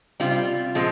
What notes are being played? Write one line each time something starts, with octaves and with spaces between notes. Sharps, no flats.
C3 G3 C4 F4
A#2 F3 G#3 C4